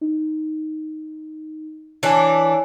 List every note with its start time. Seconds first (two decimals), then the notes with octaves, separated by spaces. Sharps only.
0.01 D#4
2.03 E3 D4 C#5 G#5